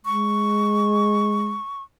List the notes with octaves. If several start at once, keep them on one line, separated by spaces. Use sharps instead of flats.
G#3 C#6